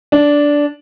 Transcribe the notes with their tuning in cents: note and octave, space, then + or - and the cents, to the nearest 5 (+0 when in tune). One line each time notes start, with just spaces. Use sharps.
D4 -10